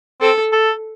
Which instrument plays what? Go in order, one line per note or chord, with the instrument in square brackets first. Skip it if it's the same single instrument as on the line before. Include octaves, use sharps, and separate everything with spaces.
[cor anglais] C4 [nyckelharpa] A4
[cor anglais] A4